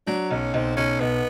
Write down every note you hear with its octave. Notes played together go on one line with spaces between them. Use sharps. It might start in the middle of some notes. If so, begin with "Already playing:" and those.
F#3 D4
B1 C#4
B1 C4
B1 C#4
B1 B3